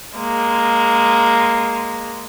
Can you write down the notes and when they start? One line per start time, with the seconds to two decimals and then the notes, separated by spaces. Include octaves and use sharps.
0.18 G#3 A#3